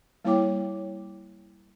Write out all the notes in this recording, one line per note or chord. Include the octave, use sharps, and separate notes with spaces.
G3 A#3 E4 C#5 G5 D6